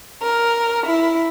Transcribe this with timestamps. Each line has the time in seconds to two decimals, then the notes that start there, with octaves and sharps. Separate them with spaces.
0.22 A#4
0.86 E4